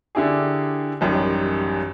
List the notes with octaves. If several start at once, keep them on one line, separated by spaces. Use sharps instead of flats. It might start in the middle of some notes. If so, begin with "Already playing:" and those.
D3 D4 E4 G4 G#4
A1 F#2 D#3 G3